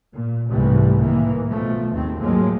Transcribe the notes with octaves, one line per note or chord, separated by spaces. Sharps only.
A#2
C2 G#2 E3 G3 A3
A2 D#3 E3 A#3
B2 F3 A3
G#1 D#2 D#3 C4
A2 F3 F#3 G#3 A#3